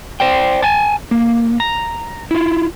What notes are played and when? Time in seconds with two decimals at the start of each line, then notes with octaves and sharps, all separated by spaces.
0.20 C5 D5 G5
0.62 G#5 A5
1.11 A#3
1.60 A#5
2.31 E4 F4